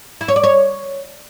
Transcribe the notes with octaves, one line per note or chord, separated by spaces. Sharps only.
E4
C#5
D5
C#5